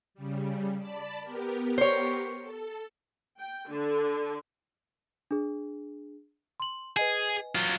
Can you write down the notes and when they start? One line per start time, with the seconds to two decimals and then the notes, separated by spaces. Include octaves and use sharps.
0.14 C#3 G3
0.78 D5 A5 B5
1.21 B3 G4 A#4
1.78 C5 C#5
2.41 A4
3.39 G5
3.69 D3
5.31 D4 G#4
6.60 C6 F#7
6.97 G#4 B4 D#5 G#5
7.55 F#3 F4